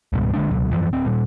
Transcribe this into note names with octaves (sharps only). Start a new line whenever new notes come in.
C#2 G#2 B2 G3
D3 G#3 D4
C#2 B2 F#3
F#2 E3 F3
D1 C4
A#2 G3